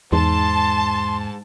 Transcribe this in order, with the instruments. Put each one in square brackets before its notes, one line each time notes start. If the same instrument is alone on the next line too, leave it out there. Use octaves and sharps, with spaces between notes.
[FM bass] E2 [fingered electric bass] G#2 [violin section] A5 [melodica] C6